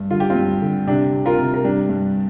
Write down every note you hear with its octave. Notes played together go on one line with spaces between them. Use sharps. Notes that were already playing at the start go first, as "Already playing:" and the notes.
Already playing: G2
D3 F4
G4
C4 F4
G2
D3
C3 D4 G4
C3
F4 A#4
C3
A#4
G2 D4 G4
G2